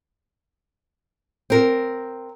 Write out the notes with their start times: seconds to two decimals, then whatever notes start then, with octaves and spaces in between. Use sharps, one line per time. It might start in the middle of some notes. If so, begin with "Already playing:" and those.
1.50 C4 A#4